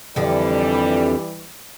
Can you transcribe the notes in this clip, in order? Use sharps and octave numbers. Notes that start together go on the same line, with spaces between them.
F2 D3 E3 G3